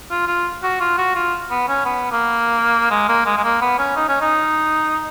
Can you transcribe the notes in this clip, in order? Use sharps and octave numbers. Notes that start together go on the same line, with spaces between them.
F4
F4
F#4
F4
F#4
F4
B3
C#4
B3
A#3
G#3
A#3
G#3
G#3
A#3
B3
C#4
D#4
C#4
D#4